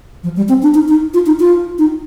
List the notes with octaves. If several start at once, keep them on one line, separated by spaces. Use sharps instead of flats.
F3
G3
C4
D4
D#4
D#4
F4
D#4
F4
D#4